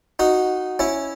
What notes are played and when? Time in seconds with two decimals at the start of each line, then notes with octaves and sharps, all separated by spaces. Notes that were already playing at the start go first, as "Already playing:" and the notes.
0.19 D#4 F#4
0.79 C#4 E4